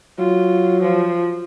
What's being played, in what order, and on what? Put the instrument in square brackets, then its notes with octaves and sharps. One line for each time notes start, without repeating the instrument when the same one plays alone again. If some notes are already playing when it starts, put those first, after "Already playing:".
[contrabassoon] F#3 [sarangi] F4
[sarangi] F3